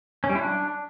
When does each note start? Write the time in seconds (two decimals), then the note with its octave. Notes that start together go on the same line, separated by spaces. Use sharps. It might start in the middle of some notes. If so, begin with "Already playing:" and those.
0.24 C#4
0.30 G3
0.35 E4
0.41 D4